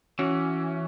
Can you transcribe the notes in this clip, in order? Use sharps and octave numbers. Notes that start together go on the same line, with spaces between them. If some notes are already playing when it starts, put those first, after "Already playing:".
E3 C#4 F#4